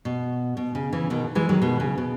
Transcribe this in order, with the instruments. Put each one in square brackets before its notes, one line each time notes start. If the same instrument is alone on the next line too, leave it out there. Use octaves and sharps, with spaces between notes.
[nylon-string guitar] B2
B2
C#3
C#3 E3
B2 D#3
E3 G#3
D#3 F#3
B2 D#3
C#3
B2